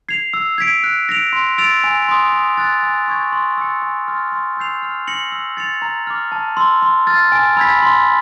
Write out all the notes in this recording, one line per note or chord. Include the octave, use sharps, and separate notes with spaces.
G#6 C7 F7
E6
G#6 B6 D7
F#6
A#6 D7 F7
C6
E6 A6 D7 F7
G#5
C6 D#6
D#6
F#6 A6
G#5
C#6 E6 G#6
C6
E6 A6 C#7
G#5
C6 F6 A6
C6
E6 G6 C7 F7
F6
A#6 C#7 F#7
E6
A6 C#7 F7
A#5
D6 F6
A5
C6 E6
C6
F6 A6
G#5
B5 E6 G#6 B6
C6